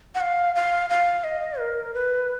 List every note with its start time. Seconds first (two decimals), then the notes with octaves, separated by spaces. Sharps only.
0.15 F#5
0.21 F5
0.55 F5
0.90 F5
1.24 D#5
1.59 A#4
1.94 B4